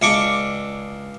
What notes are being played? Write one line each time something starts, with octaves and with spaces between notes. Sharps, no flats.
C#2 D4 C#6 D6